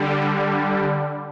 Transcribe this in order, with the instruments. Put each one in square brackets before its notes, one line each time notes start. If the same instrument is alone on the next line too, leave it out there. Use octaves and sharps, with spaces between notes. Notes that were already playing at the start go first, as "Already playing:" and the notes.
Already playing: [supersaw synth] D3 G3